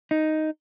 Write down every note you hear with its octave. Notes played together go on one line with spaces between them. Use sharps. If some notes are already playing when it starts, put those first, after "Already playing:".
D#4